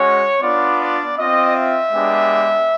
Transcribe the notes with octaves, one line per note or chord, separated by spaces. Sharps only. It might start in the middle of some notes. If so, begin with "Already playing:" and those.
Already playing: G#3 C#4 F#4 C#5
B3 D4 F4 D5
D5
C4 F4 D#5
E5
G#3 B3 D4 G4